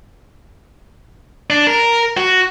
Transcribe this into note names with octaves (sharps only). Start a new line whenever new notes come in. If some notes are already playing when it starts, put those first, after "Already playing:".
D4
A#4
F#4